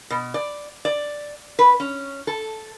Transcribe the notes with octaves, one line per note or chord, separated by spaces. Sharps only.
B2
D5
D5
B4
C#4
A4